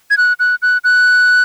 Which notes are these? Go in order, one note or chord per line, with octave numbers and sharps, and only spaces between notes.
G#6
F#6
F#6
F#6
F#6